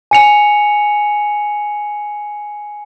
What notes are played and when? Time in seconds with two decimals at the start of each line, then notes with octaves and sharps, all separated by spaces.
0.11 G#5 C#7 F7